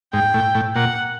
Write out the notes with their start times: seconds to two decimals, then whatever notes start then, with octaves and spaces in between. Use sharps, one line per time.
0.13 G#2 G5
0.34 A2
0.55 A2
0.76 A#2 F#5